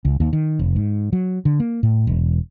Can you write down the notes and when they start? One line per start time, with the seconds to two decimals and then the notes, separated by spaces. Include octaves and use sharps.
0.05 C#2
0.20 D#2
0.33 D#3
0.59 F1
0.76 G#2
1.13 F#3
1.45 D3
1.60 A#3
1.83 A2
2.07 E1